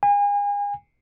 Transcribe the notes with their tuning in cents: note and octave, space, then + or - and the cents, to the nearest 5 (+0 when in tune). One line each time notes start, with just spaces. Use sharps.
G#5 -35